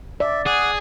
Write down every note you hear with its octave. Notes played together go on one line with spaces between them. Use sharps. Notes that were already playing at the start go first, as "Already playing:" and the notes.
D5 E5
G#4 F#5 D6